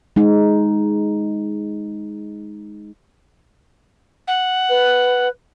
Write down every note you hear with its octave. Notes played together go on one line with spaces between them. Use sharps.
G#3 D#4
F#5
B4